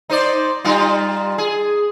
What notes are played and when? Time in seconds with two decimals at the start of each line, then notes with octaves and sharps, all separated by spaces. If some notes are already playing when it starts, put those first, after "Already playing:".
0.10 D#4 C5 D5
0.65 G3 D#4 F4
1.38 G#4